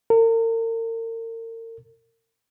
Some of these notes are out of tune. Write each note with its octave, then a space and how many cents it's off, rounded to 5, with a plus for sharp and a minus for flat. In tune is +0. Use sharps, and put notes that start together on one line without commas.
A#4 -40